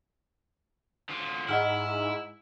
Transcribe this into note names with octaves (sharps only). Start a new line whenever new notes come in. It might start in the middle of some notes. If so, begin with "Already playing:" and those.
D3 F4
G#2 E4 D#5 F#5 F6